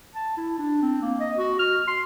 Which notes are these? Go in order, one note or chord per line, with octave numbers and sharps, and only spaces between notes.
A5
E4
D4
C4
A#3
D#5
F#4
F6
C6